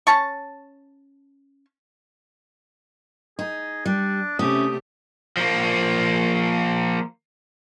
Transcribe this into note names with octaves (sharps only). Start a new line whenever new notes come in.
C#4 A5 C#6
D#4 G#4
G3 D4
C3 A3 C#4 G4 D#6
F3 A#3